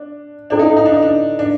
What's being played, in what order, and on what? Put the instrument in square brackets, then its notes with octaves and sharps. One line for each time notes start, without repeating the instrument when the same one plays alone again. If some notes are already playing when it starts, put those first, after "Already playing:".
Already playing: [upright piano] D4
[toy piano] C#4 E4 A4 D5 [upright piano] D4
[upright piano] D#4
D4
D#4
D4
D#4
D4
D4